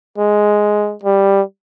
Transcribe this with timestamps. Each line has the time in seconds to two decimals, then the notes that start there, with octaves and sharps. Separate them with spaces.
0.18 G#3
1.03 G3